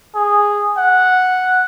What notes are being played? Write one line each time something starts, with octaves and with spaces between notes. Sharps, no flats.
G#4
F#5